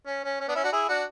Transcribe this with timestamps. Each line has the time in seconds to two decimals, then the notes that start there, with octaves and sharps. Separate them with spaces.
0.07 C#4
0.24 C#4
0.40 C#4
0.48 B3 D4
0.55 C#4 E4
0.63 D4 F#4
0.72 E4 G#4
0.89 D4 F#4